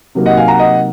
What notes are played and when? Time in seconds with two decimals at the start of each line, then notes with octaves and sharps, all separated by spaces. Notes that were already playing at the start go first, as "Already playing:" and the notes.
0.15 C3 F#3 A#3 D#4
0.26 D#5 F#5
0.37 F5 G#5
0.48 F#5 A#5
0.59 D#5 F#5